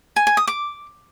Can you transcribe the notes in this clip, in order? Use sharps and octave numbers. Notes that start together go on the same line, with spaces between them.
G#5
G#5
D#6
D6